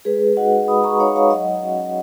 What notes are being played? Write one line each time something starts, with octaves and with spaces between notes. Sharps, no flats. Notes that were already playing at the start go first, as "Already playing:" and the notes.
G#3 G#4 B4
D#4 F#4 D#5 F#5
G#3 B5 D#6
A#5 C#6
D#4 F#4 C#5 F5
C#5 F5
F#3 D#5 F#5
C#4 F#4